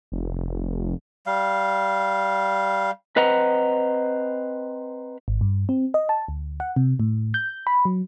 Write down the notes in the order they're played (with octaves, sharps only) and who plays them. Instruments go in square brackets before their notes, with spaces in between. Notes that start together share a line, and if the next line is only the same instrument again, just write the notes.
[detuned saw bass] F1
[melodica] G3 F5
[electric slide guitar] C4 B4 C5 D#5 F#5 A#5
[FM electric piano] G#1
G2
C4
D#5
A5
D2
F#5
C3
A2
G6
B5
F#3